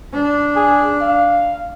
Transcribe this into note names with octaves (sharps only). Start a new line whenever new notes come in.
D4
G#4
F5